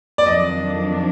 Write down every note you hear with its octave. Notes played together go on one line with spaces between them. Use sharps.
D5
F2 D#3 F#3 D4 D#5